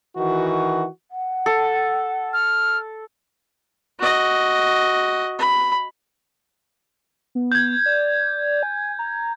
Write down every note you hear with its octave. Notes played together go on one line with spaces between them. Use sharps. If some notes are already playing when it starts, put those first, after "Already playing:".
D#3 E3 F#4
F#5
A4
F6
F#4 D#5
B5
B3
G6 G#6
D5
G#5
A#5